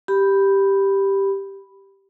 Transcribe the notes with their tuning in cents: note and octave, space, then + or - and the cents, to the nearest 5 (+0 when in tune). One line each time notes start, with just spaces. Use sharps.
G4 +0 B5 +0